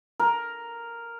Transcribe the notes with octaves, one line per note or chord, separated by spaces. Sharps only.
A#4